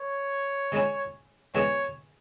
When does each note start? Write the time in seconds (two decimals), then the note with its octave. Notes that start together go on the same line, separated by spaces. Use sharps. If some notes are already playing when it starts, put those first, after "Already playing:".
Already playing: C#5
0.72 C#3 G#3 C#4 E4
1.55 E2 C#3 G#3 B3 E4 C#5